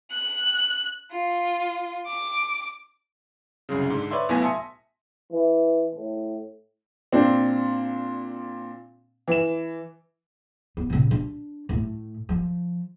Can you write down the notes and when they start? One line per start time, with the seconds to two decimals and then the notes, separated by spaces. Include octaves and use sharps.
0.11 F#6
1.12 F4
2.06 D6
3.69 C2 F#2 C#3
3.90 G#2 D3
4.11 B4 C#5 D5 E5 C6
4.29 B1 A2 B3 G#5 A#6 B6
4.42 E5 G#5 A5 C6 D#6 C#7
5.32 E3
5.95 A2
7.12 A#2 C4 D4
9.28 E3 E7
10.77 B3
10.90 A#2 C#3
11.11 D4
11.69 A2 A3
12.29 F3